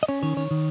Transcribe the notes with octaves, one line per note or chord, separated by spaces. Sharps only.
D#5
C#4 C#5
D#3 C#5
D#3 C#5
D#3